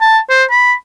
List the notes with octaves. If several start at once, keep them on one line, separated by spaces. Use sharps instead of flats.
A5
C5
B5